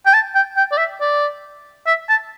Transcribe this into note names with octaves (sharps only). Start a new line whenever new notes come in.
G5
A5
G5
G5
D5
E5
D5
E5
A5